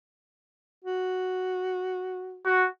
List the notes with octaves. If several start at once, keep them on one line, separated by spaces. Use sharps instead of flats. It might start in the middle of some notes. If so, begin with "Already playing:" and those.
F#4
F#4